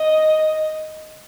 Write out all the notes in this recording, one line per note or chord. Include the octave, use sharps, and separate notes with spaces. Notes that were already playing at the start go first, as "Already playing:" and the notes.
Already playing: D#5